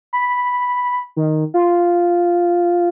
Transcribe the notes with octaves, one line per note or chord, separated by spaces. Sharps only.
B5
D#3
F4